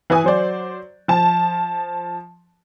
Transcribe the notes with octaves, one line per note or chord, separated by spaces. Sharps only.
E3 B4 G#5 D#6
F#3 C5 D5
F3 A5